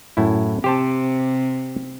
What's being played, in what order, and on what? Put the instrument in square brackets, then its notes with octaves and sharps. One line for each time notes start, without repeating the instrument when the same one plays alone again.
[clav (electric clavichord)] F#2 A2 E4
[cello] C3 [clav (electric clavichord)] G4 C5 A5